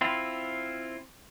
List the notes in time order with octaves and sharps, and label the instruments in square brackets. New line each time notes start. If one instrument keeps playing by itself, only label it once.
[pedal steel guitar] C4 E4 F4